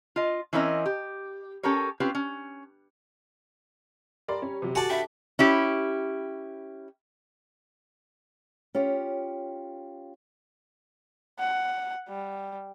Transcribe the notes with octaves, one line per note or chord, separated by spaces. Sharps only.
F4 D#5
E3 C4 C#4 E4 A#4 D#5
G4
C#4 G4 A4 A#4 C#5
C4 C#4 F4 G4 B4
C#4
G3 A#4 D5 A#5 C6 E6
C#4
C3 F#3
F#4 A4 D5 G#5 A5
D4 D#5 E5 G5 B5
C#4 E4 G4
C#4 F4 G4
F#5
G3